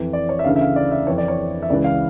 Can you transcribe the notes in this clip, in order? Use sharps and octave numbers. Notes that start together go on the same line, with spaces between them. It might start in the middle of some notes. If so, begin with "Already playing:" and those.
Already playing: F2 E3
D5
C#5
E5
D2 C#3 E3 F5
E5
F5
D5
E5
F2 E3 C#5
D5
C#5
E5
C#2 C#3 E3 D5
F5